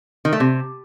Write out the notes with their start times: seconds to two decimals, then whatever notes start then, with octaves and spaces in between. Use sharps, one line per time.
0.25 D#3
0.33 A3
0.40 C3